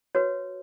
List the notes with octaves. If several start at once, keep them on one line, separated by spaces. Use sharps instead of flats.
F#4 B4 C#5